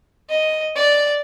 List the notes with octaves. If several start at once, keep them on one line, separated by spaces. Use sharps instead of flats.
D#5
D5